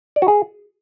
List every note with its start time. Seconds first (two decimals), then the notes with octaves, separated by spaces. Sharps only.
0.16 D5
0.22 F#4
0.28 G#4